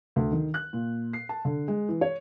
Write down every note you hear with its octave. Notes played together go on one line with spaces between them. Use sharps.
D2
D#3
F#6
A#2
C7
A5
D3
G#3
E3
C#5